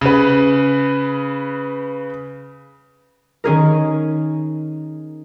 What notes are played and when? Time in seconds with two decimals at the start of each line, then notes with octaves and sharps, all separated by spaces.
0.01 C#3 B4
3.44 D#3 C#4 G#4 A#4